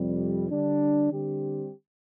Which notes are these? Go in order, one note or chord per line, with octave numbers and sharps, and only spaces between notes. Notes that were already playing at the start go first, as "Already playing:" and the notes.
Already playing: F2 C3 G3
D3 G3 D4
D3 G3 C4 G4